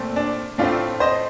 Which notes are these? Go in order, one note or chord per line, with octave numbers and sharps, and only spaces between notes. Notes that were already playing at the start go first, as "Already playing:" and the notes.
Already playing: A#2 A3 C4
D4
A2 A3 C4 D4 F4
C5 D#5